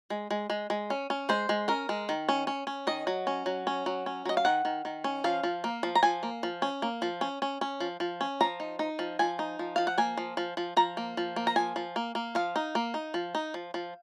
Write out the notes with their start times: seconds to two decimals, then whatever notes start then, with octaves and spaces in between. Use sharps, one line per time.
0.10 G#3
0.31 G#3
0.50 G#3
0.70 G#3
0.90 C#4
1.10 C#4
1.29 G#3 C5
1.49 G#3
1.68 C#4 A#4
1.89 G#3
2.09 D#3
2.29 C#4
2.47 C#4
2.67 C#4
2.87 D#3 D#5
3.07 F#3
3.27 C#4
3.46 F#3
3.67 C#4
3.86 F#3
4.06 C#4
4.25 F#3 D#5
4.37 F5
4.45 D#3 F#5
4.65 D#3
4.85 D#3
5.04 C#4
5.24 F3 F5
5.43 F3
5.64 A#3
5.83 F3
5.95 A#5
6.03 F3 G#5
6.23 A#3
6.43 F3
6.62 C#4
6.82 A#3
7.02 F3
7.21 C#4
7.42 C#4
7.61 C#4
7.80 F3
8.00 F3
8.21 C#4
8.41 F3 A#5
8.60 D#4
8.79 D#4
8.99 F3
9.19 F3 G#5
9.39 D#4
9.59 F3
9.76 F3 F5
9.87 F#5
9.98 A#3 G#5
10.17 F3
10.37 F3
10.57 F3
10.77 F3 A#5
10.97 A#3
11.17 F3
11.36 A#3
11.47 A#5
11.56 F3 G#5
11.76 F3
11.96 A#3
12.15 A#3
12.35 F3 F5
12.56 D#4
12.75 A#3
12.94 D#4
13.14 F3
13.35 D#4
13.54 F3
13.74 F3